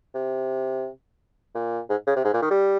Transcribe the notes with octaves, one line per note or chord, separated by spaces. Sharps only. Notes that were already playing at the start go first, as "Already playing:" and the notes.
C3
A#2
G#2
C#3
C3
G#2
A#2
D#3
G3